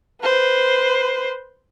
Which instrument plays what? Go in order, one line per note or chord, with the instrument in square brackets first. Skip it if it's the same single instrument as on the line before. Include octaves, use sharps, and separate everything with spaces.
[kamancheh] B4 C5